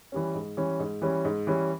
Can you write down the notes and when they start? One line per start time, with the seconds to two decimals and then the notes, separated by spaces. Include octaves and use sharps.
0.12 E3 G3 C#4
0.35 G#2
0.57 E3 G3 C#4
0.79 G#2
1.02 E3 G3 C#4
1.25 G#2
1.47 E3 G3 C#4